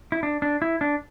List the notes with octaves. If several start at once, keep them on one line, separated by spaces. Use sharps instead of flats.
E4
D4
D4
E4
D4